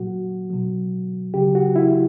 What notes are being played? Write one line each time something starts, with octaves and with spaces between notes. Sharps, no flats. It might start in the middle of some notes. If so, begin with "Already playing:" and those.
Already playing: A#2 F#3 F#4
B2 F#3
C#3 F#3 G4
F#4
E4